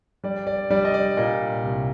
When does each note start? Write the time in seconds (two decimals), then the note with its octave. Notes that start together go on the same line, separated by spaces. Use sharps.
0.24 G3 D5
0.47 D5
0.70 G3 D5
0.85 D#5
0.94 D5
1.17 A#2 D#5
1.63 C2